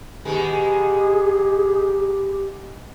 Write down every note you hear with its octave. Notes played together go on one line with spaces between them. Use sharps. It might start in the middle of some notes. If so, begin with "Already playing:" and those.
B2 D#3 G#3 G4 G#4